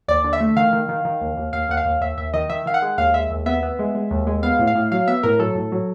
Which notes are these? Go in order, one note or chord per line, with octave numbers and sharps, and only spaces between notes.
D#2 D5
D3
E5
A3
D#3 F5
D#3
D#3
D#3
D#2
D#2
D#2 F5
D#2 F#5
F5
D#2
D#2 E5
D#2 E5
D#3 D#5
D#3 E5
D#3 F5
F#5
G#3
D#2 F5
G#3 E5
D#2
B3 E5
B3
G#3
G#3
D#2
G#3
B3 F5
A2
F5
A2
F#3 F5
B3 E5
A2 A#4
F#3 A4
A2
F#3